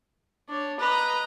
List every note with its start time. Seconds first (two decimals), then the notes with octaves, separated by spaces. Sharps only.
0.49 D4 C#5
0.80 B4 D#5 A#5